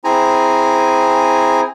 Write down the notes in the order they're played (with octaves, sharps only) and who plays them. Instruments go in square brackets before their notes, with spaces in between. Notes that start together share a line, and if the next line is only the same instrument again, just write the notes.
[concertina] C4 E4 G#4 G#5 A#5